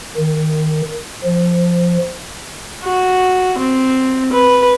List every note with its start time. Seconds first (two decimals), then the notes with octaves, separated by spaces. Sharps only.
0.17 D#3
1.24 F3
2.83 F#4
3.58 C4
4.33 B4